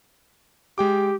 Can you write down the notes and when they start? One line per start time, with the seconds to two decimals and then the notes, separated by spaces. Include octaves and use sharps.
0.78 G#3 G4 G5 D6